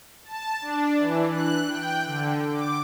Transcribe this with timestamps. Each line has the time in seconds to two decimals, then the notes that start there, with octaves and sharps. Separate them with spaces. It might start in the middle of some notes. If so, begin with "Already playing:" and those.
0.25 A5
0.61 D4
0.98 E3
1.30 F#6
1.69 G5
2.06 D3
2.52 D6